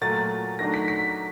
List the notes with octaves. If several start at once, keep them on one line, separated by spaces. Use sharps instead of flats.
A#2 F#3 A3 A6
D#3 F#3 A3 D4 A#6
B6
B6